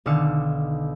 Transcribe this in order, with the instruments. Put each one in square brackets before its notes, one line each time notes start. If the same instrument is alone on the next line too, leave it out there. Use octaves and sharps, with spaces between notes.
[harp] B1 D3 D#3 F5 E6 C#7